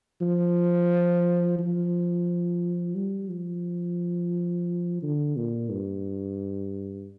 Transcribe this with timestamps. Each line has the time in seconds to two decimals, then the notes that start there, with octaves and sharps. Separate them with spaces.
0.21 F3
1.58 F3
2.95 G3
3.30 F3
5.02 D3
5.36 A#2
5.71 G2